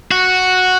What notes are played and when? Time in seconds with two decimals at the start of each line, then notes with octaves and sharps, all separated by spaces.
0.11 F#4